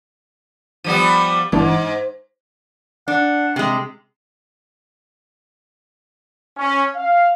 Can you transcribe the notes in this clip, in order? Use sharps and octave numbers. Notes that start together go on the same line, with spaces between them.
F3 G3 B3 D#7
G1 G#2 E3 D4
D4 F#5
C3 G#3
C#4
F5